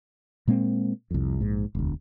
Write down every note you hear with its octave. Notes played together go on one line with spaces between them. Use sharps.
A#2 G#3 A#3 C4
C2 F2
A#1 G#2
E1 D2